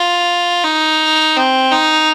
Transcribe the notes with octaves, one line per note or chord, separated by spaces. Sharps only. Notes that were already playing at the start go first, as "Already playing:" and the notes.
Already playing: F4
D#4
C4
D#4